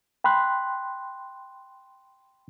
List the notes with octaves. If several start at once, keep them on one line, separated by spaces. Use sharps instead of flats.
G5 B5 C6 F#6